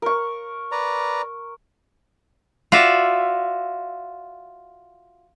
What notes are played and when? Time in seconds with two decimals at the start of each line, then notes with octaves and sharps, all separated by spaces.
0.02 A#4 C#6
0.72 B4 D5 A#5
2.72 F4 F#4 D5 E5